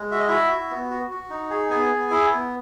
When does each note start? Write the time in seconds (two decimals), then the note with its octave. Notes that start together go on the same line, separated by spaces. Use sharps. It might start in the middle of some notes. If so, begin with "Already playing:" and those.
Already playing: G#3
0.11 F#4 E5
0.19 D#5
0.28 E4 F#4 E5
0.51 F#4
0.71 B3
0.91 F#4
1.10 F#4
1.30 D#4
1.50 G#4
1.70 B3 G#4 G#5
1.90 B3
2.10 E4
2.30 B3